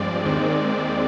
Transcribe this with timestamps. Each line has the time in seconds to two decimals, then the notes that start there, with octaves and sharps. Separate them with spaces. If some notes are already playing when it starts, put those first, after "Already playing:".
Already playing: G2 F3 G#3 C4 D5
0.24 D#2 D#3 G#3 C4